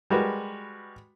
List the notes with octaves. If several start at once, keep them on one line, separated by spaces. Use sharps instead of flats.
G3 G#3 F#4 A#4 B4